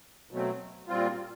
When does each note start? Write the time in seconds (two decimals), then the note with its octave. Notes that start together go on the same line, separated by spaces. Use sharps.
0.31 B2 F#3 A3 C4
0.88 A#2 G3 C4 F4